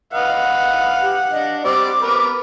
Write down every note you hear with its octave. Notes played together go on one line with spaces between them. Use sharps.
B4 D#5 F5 F#5
G4
D4 D#5
G3 C4 D5 D6
B3 A#4 B4